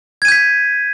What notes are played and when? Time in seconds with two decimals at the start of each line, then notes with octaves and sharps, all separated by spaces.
0.22 G#6
0.25 D#7
0.28 G6
0.32 B6